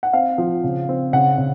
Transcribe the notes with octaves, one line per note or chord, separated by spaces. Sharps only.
F#5
C4 F5
F3
C#3
C4
C#3 F#5
C#3